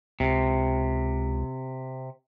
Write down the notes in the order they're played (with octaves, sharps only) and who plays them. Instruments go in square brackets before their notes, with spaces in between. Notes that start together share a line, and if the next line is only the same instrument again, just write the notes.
[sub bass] C#2 [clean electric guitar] C3